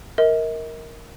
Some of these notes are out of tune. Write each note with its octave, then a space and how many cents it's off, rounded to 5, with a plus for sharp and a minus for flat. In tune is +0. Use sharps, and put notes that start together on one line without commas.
A#4 +0 D#5 +40